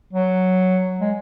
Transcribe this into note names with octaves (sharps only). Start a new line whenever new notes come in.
F#3
G#3